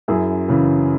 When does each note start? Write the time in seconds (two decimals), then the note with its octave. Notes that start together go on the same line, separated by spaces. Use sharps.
0.08 F#2 E4 G#4
0.48 C#3 E3